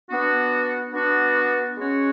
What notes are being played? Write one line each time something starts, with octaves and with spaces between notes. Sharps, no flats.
B3 D4 F#4
B3 D4 F#4
G#3 C#4 F#4 C#5